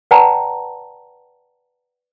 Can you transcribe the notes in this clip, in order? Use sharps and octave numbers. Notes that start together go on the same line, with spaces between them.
B4 D5 F#5 G5 A5 A#5